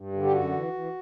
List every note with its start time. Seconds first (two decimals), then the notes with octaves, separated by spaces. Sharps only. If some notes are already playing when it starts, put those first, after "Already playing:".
Already playing: G2
0.13 D3
0.23 G4
0.32 F#2 F#4
0.52 E3
0.73 E3